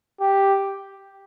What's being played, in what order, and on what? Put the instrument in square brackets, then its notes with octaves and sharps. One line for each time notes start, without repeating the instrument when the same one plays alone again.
[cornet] G4